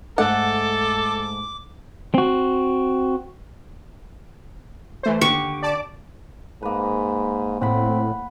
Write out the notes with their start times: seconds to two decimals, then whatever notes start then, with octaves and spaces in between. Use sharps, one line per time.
0.18 G#2 A3 A4 F#5 D6
2.14 C4 F#4
5.03 E3 A3 C5
5.21 D#2 D3 G4 C#6
5.62 D5 A5 D6
6.63 G#2 A#3 B4
7.62 A2 C4 F#5 B5